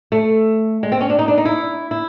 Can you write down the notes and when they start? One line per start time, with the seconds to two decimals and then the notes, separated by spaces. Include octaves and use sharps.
0.12 A3
0.83 G#3
0.92 C4
1.01 C#4
1.10 D4
1.19 D#4
1.28 D4
1.38 D#4
1.45 E4
1.91 E4